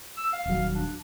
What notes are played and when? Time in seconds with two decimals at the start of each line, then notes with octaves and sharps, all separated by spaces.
0.17 E6
0.33 F5
0.46 D#1 F#3
0.75 D4